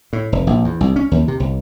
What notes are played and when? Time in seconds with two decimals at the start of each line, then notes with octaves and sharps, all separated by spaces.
0.13 A2
0.32 F1
0.47 A#1
0.64 E2
0.81 C2
0.96 C#4
1.11 D#2
1.28 C3
1.40 C2